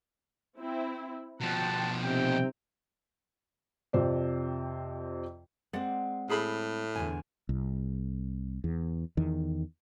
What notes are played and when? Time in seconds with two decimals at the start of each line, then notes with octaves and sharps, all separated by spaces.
0.59 C4 E4
1.41 B2 F3 F#5 G5 A5
2.04 C3 C4 D#4 G5
3.93 F2 C3 C5 D5
5.73 G#3 C4 D5 F#5
6.30 A2 G#4 B5
6.95 E2 D3 G#5
7.49 C2
8.64 E2
9.17 E2 D#3